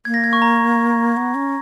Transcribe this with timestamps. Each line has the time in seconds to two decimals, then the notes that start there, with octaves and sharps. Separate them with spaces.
0.05 A#3 G#6
0.14 A#6
0.24 G#6
0.33 C#6
0.42 A#5
1.17 B3
1.35 C#4